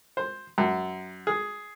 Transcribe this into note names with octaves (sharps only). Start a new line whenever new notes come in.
C5
F#2
G#4